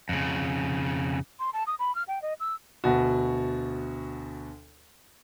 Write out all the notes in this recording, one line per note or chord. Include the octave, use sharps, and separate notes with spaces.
F2 C#3
C6
A5
D#6
B5
F6
G5
D#5
E6
D2 B2 F#4